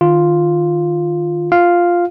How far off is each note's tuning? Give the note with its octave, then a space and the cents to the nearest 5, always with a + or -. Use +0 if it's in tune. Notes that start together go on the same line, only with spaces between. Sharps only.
D#3 -15 F4 +0
F4 +0 F5 +0